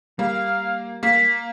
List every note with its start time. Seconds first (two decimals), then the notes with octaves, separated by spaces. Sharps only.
0.19 G3 A#3 F5
1.03 A#3 B6